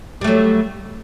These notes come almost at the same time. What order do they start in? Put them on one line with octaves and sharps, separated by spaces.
G3 A3 F#3